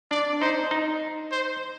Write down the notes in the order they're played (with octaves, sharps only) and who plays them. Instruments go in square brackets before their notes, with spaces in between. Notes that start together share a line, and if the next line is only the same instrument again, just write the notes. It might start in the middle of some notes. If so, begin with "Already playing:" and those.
[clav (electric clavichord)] D4 [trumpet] D5
[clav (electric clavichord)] D#4 [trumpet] C5
[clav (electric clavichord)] D#4
[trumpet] C5